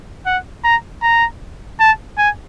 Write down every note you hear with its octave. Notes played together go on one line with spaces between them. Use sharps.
F#5
A#5
A#5
A5
G#5